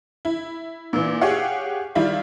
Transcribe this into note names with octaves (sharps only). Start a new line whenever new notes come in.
E4
A#2 E3
G4 G#4 C#5 F5 F#5
D#3 G3 E4 F4